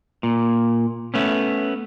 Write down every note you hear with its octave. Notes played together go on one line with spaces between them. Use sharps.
A#2
A3 B3 C#4